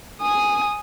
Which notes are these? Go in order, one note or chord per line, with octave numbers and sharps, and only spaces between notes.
G#5 D#6